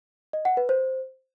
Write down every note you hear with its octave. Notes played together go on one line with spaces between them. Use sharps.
D#5
F#5
B4
C5